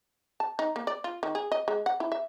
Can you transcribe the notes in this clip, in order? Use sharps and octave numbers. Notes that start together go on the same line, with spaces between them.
A5
D#4
A#3
D5
F4
D#3
G#4
D#5
G#3
F#5
E4
E5